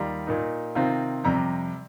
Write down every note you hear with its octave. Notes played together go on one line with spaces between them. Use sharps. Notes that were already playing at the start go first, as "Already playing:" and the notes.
Already playing: D#2 D#3 G3 F4 A#5
A#2 A#3 D#4
C3 D#3 C4 F4
F2 C3 G3 A#5